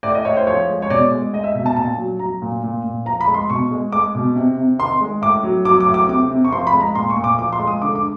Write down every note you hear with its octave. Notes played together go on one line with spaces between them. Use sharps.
A2 D5
D#5
A2 C#5
C5
F3 C#5
G#3
C#5
B2 D5
G#3
G#3 D#5
E5
B2 E5
A5
A#2 A5
F#3
F#3 A#5
A#2
A#2
A#2
F3 A#5
B5
G#3
C6
B2 C#6
G#3
G#3 D6
B2
C3
C3
D#3 C6
G#3
A2 D6
F#3
F#3 D6
D6
A2
D6
C3 D6
C3
C#6
F3 C6
B5
G#3
A#5
A#2 C6
C#6
A#2
D6
F3 D6
C6
G#3
D#6
D3 D6
D6